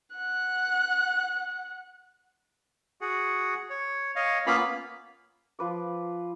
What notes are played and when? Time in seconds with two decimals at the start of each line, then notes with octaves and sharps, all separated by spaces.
0.15 F#5 F#6
3.01 F#4 G#4 F#5
3.70 C#5
4.16 C#5 D#5 F5
4.47 A#3 B3 C#4 F4 F5 B5
5.59 F3 B4 D6